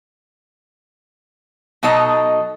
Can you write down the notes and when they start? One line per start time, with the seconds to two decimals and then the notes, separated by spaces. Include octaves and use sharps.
1.83 B2 F#3 D#4 A4 D#5 A#5